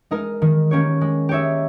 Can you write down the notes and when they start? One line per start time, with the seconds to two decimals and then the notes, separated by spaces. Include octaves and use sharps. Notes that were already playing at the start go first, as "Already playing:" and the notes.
0.11 G#3 D#4 A#4 D#5
0.42 D#3
0.71 A#3 C#4 G4 C#5
1.01 G#3
1.29 D#4 G4 C#5 E5